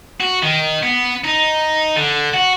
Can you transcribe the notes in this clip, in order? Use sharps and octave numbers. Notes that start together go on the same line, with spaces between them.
F#4
D#3
B3
D#4
D3
F#4